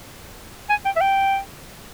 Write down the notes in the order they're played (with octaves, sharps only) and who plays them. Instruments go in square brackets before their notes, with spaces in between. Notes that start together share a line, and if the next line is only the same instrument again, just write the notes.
[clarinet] G#5
G5
E5
G5